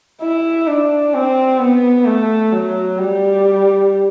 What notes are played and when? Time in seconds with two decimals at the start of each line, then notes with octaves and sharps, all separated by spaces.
0.22 E4
0.67 D4
1.14 C4
1.60 B3
2.06 A3
2.52 F#3
2.98 G3